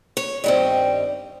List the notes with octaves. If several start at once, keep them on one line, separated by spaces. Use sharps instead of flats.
C#5
G2 D#3 G3 C4 D#5